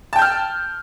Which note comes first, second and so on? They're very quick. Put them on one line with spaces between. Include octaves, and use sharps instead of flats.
A5 G5 G6 F6